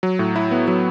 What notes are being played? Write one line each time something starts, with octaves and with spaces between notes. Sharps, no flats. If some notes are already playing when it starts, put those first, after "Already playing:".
F#3
A2
E4
B3
F#3